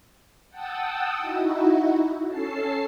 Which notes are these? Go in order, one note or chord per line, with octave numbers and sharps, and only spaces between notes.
F#5 G5 A5 D#6 E6
D#4 E4 F#4
C#4 A4 A5 C7